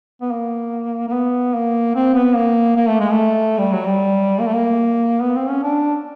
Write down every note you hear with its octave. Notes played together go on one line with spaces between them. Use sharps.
B3
A#3
A#3
B3
A#3
C4
B3
A#3
A#3
A3
G#3
A3
G3
F#3
G3
A#3
A3
A#3
B3
C4
C#4
D4